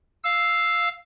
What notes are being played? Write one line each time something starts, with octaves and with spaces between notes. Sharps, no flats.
F5 E6